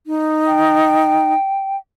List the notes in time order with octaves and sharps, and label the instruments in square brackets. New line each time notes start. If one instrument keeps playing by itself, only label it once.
[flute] D#4
[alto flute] G5